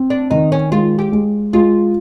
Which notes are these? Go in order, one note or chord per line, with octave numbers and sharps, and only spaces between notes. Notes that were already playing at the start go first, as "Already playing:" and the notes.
Already playing: C4
D4
D#3 D#4
C#4
G#3 F4
G4
G#3
G#3 F4